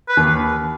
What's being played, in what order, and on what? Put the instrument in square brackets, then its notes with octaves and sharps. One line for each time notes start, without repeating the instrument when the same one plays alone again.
[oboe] B4
[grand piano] D#2